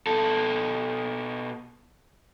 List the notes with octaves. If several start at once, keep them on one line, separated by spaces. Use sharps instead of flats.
B2 A4